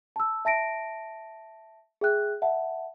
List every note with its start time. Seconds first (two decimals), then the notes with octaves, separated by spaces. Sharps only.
0.16 A5 E6
0.45 E5 A5 A#6 D7
2.01 G#4 E5 G5 F#6
2.42 E5 F#5 A5